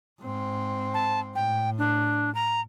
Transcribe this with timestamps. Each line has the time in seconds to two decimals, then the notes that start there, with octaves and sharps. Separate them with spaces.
0.22 G#2 C4
0.94 A5
1.35 A2 G5
1.78 D4
2.35 A#5